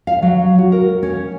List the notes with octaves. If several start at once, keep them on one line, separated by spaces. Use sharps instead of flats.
F5
F#3
F#4
A#4
C#4